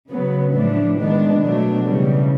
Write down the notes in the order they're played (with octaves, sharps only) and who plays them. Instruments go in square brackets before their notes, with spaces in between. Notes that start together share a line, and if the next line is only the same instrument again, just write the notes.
[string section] C#3 F#3 B3
A2 F3 A3 D4
D#3 G#3 B3 D4
B2 F#3 A3 D4
C#3 E3 G3